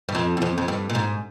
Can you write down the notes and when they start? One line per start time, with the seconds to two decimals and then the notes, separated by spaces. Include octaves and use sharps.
0.09 G2
0.15 F2
0.37 E2
0.42 F2
0.58 F2
0.68 G2
0.90 A#2
0.95 G#2